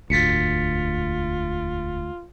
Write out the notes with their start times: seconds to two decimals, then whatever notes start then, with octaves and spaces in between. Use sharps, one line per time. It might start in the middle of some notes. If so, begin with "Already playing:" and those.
0.10 E1 D2 G#2 F4 A6 B6 C#7